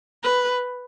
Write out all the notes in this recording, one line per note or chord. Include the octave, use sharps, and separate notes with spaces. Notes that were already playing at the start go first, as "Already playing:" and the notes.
B4